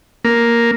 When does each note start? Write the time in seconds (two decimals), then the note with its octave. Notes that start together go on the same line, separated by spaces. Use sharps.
0.25 A#3